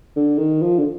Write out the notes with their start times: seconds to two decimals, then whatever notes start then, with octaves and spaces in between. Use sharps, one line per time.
0.16 D3
0.38 D#3
0.62 F3
0.78 D3